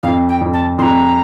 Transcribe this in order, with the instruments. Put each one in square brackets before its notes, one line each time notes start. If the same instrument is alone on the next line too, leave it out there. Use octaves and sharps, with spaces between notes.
[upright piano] F2 [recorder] F5
[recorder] G5
[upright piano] F2
[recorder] A5
[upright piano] F2 [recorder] A#5 C6